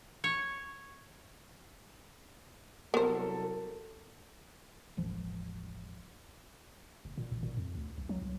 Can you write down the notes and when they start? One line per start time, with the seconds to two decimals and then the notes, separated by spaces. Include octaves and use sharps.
0.24 C#5
2.94 C2 F#3 B3 A4 A#4 C5
4.97 E1 A1 F3
7.05 F#1
7.17 A#2
7.32 A1
7.43 A#2
7.57 F2
7.75 D2
7.98 B1
8.09 F#3
8.22 C2